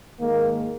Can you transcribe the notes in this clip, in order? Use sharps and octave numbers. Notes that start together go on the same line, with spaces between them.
G#2 D#3 G#3 A#3